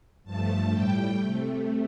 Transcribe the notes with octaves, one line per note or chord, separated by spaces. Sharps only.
G2 F3 A3 A5
A2 G3 G5
C3 A3